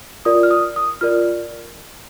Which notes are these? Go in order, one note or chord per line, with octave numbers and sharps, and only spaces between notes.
F4 A#4 D5 D#6
F6
D#6
D#6
F4 A#4 D5 F6